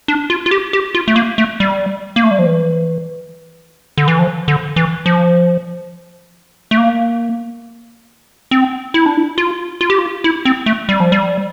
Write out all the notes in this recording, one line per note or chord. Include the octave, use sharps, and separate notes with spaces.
D4
F4
F4
G4
G4
F4
A3
A#3
A3
G3
A#3
A3
G3
F3
E3
D3
E3
F3
D3
E3
F3
A3
A#3
C4
E4
D4
E4
F4
F4
G4
F4
E4
C4
A3
G3
F3
G3